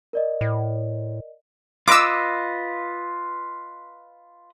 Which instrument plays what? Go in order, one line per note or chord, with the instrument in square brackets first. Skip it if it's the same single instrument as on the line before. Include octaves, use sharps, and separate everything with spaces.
[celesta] A#4 D5 D#5
[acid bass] A2
[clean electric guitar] F4 B4 D#5 [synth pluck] D6 E6